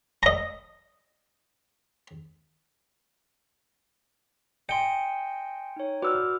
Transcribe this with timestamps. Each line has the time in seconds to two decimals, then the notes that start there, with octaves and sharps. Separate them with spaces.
0.23 D#5 A#5
4.69 D#5 G5 G#5 C6 C#7
5.76 D#4 C#5
6.02 F#4 B4 D5 D6 E6 F6